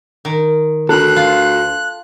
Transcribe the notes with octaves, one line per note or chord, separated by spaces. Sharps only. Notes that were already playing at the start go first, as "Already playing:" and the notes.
D#3
D2 A4 F#6
F4